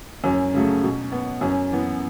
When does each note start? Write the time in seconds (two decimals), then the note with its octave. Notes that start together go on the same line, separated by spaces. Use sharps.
0.24 F#2 C#4
0.54 C#3 F#3 A3
0.83 B2
1.12 B3
1.41 F#2 C#4
1.71 E3 B3